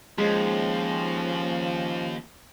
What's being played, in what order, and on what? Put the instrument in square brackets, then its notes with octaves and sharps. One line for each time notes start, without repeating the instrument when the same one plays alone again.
[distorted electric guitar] D#2 [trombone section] F3 C#4 [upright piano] G#3